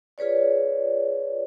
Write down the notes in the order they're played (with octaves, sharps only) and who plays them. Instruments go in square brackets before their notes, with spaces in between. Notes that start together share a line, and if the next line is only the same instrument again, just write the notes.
[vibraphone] F4 G#4 B4 C#5 D5